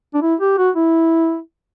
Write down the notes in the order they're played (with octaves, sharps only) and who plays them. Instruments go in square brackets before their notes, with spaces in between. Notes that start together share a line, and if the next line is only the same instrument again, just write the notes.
[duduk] D4
E4
G4
F#4
E4